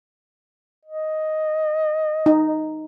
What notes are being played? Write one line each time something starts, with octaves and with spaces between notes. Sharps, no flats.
D#5
D#4